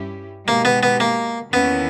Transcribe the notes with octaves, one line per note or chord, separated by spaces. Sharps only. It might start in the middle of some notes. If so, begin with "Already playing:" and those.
Already playing: G2 G3 C#4 E4 G4
B2 G#3 A#3 D#4 G4
B3
B3
A#3
E2 D#3 A#3 B3 C#4 E4